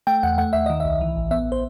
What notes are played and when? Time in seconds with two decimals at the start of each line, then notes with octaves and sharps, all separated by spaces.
0.07 A3 G5
0.23 E2 F#5
0.38 A3 F#5
0.53 D#2 E5
0.66 D#3 D#5
0.80 C2 E5
1.01 E3
1.16 A1
1.31 B3 E5
1.52 C5